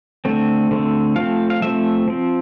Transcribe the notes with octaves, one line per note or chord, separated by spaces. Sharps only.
D3 A3 C4
D3 A3 C4
F3 A3 C4 F5
F5
F3 A3 C4 E5
F3 C4